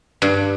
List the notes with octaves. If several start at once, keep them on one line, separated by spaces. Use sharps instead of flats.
G2